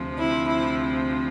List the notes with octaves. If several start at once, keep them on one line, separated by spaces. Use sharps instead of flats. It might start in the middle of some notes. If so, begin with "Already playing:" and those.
Already playing: D2 C3 F3
E4
E4